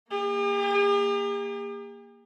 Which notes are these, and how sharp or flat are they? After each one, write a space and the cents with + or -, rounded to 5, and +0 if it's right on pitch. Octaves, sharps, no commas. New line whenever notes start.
A#3 +0 G4 +45